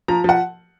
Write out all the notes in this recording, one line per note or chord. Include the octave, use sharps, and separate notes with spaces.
F3 A#5
F3 F#5